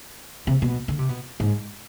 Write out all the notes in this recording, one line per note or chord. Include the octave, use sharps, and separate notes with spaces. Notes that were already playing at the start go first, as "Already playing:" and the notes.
C3
B2
D3
C3
B2
G#2